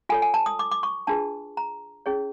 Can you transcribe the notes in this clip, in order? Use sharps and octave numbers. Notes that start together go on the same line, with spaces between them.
F4 A4 C#5 G#5
G#5
A5
D#6
D6
D6
C#6
D4 F4 G#4 B4 A5
A#5
C#4 E4 G#4 C#5